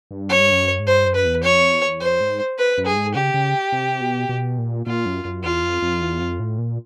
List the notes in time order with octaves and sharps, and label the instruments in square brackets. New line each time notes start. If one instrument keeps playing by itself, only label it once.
[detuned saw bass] G2
[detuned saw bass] F#2 [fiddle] C#5
[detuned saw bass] G2
F#2
G#2
[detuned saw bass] G2 [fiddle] C5
[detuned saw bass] F#2
[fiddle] B4
[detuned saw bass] E2
[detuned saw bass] F2 [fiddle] C#5
[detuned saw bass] E2
[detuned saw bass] F2 [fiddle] C5
[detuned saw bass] G#2
[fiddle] B4
[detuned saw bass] F#2
[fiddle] G#4
[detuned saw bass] G2
G#2
[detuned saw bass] C#3 [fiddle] G4
[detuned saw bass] C#3
C3
B2
B2
A#2
[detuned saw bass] A#2 [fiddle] F4
[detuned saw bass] F#2
F#2
[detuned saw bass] E2 [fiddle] F4
[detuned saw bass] F2
F2
E2
F2
A2
A#2